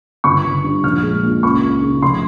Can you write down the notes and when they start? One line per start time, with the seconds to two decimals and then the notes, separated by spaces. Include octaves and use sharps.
0.24 G1 C#6
0.44 G1
0.64 G2
0.84 A#1 F6
1.03 G#3
1.23 A#2
1.43 C#2 C#6
1.63 C#2
1.82 C#3
2.02 F1 C6